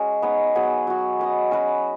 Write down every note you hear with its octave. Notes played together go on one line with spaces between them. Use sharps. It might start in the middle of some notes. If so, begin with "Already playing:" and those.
Already playing: G#3 C#4 F#4 B4 D#5
B3 D#4 G#4 C#5
F#3 B3 G#4 B4
F#3 B3 F#4
C#4 B4 D#5
C#4 F#4 B4